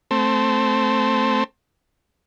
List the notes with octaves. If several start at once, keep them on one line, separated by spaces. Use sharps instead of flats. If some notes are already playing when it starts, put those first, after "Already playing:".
A3 C4